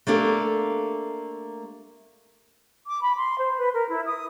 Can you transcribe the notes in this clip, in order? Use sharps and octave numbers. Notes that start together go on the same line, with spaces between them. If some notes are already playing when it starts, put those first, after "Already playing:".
A3 A#3 D4 G4 A4
D6
B5
C6
C5
B4
A#4
E4
D#6